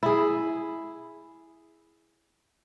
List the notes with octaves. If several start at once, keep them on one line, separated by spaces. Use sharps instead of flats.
E4 G#4